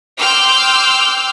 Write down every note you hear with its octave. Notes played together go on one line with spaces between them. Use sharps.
G5 C6 D6 E6 F6 G6